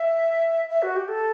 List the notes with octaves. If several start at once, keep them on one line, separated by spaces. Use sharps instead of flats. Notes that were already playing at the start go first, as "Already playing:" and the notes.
Already playing: E5
E5
F#4
G4
A4